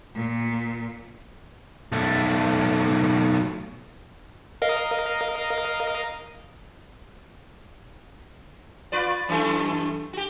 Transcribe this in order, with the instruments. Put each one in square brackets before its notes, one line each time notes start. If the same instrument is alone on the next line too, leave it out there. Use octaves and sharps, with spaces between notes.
[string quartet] A#2
[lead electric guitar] B1 A3
[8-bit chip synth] A#4 D#5 F5
[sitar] F4 B4 D5
F#2 E3 A3
F#4 G4